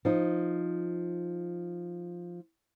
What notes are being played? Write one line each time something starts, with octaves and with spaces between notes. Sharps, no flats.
F3 D#4